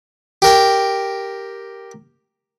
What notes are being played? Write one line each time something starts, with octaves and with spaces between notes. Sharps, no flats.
G4 A#4 G5